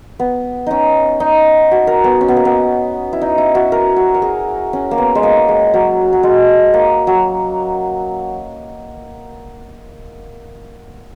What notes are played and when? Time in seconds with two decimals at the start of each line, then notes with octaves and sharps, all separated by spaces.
0.19 B3
0.66 C#4 D#4
1.20 D#4
1.71 F#4
1.87 A#4
2.04 B3
2.21 C#4
2.28 B3
2.37 A#3
2.45 B3
3.13 E4
3.21 D#4
3.38 E4
3.55 F#4
3.72 A#4
3.96 F#4
4.14 A#4
4.22 G#4
4.73 C#4
4.91 A#3
4.98 B3
5.15 G#3
5.23 A#3
5.48 G#3
5.74 F#3
6.13 F#3
6.23 G#3
6.74 A#3
7.07 F#3